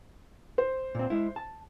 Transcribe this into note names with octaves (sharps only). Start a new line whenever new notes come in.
C5
A#2 C4
G#3 E4
A5